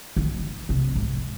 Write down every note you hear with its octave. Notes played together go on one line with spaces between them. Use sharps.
D#3
C3
G#2